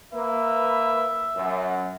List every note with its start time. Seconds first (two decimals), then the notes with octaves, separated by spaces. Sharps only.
0.13 A#3 B4 E5
1.35 F#2